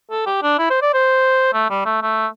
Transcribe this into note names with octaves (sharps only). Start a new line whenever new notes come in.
A4
G4
D4
E4
C5
D5
C5
A3
G3
A3
A3